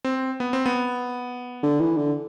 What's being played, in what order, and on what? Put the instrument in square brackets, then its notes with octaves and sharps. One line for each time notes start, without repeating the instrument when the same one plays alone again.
[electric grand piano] C4
B3
C4
B3
[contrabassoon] D3
E3
D3